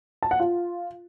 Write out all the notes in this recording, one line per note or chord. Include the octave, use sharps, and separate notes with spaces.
A5
F#5
F4